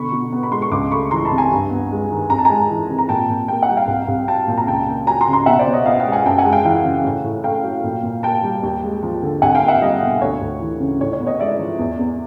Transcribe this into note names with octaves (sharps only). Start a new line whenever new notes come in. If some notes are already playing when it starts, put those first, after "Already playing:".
Already playing: B2 D3 B5 C#6
B2
B3
B5
G#3 C6
C#6
C#2 C6 D6
A3 B5 C#6
E3 A#5 C6
A5 B5
C3
G#5 A#5
G2
B3
G#3
D#3
F2 A#5
A5
G#3 G#5 A#5
E3
C3
A#5
A#2 G5 A5
A#2
A#3 G5
F#5
G3
F5 G5
C2
C2
F#3 G5 A5
A#2
A#5
C#2 G5 A5
A#3
F#3 G#5 A#5
A#5 C6
C#3
A#5 C6
B2 E5 F#5
C5 D5
B2
C#5 D#5
B3 D#5 F5
F5 G5
G#3
F#5 G#5
F#2 G5 A5
F#5 G#5
G#3
F5 G5
E3 F5 G5
C#3
A2
A2
A3 F5 G5
F#3
A#2
A#2
A#3 G5 A5
G3
D#2
G#3
F3
D3
C2 F#5 G#5
F5 G5
A#3
E5 F#5
G3 D#5 F5
B2
D2 C#5
D2
E3
C#3
A2 C#5
C#5
B3
C#5 D#5
G#3 D5 E5
F3
E2
E2